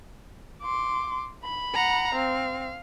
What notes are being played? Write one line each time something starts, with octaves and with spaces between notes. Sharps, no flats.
C6 D6
B5
F#5 A#5
C4 F5